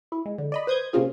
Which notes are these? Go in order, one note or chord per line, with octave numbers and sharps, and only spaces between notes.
E4
G#3
D3
D5 D#5 B5
B4 C5 D#6 G6 G#6
C3 A#3 C4 C#4 F4 G#4